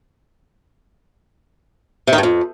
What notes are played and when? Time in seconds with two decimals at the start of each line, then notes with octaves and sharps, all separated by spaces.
2.07 C3
2.13 D#3
2.18 G2
2.23 F2